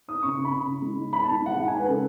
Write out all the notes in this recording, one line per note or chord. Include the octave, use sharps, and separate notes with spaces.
D#4 D#6
C#3 C#6
C#3
B5
C#3
C#3
G#3
D#4
D#4 B5
G#3 A5
G#3 F#5
G#3 F#5
D#4 G#5
B4
C#3 A4